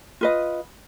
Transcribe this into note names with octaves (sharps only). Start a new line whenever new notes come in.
F4 B4 D#5